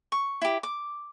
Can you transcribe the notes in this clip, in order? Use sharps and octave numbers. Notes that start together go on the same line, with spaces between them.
C#6
E4 G4
D6